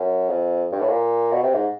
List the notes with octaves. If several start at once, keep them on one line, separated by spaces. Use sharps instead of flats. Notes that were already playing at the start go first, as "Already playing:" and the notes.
Already playing: F#2
F2
G2
A2
A#2
B2
C3
G#2